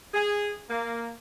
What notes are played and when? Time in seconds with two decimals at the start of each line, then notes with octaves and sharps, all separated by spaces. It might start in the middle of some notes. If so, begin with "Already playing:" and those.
0.14 G#4
0.69 A#3